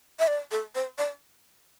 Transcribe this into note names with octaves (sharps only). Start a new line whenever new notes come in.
E5
D5
A4
C5
D5